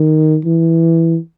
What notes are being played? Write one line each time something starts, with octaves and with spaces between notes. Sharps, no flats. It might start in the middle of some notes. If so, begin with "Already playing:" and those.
Already playing: D#3
E3